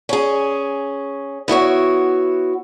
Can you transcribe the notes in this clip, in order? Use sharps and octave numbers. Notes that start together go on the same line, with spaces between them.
C#4 G#4
B3 E4 F#4 C#5